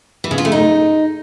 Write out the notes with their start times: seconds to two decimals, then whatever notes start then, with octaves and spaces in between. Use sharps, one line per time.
0.24 E3
0.31 C#3
0.38 F4
0.45 A3
0.52 D#4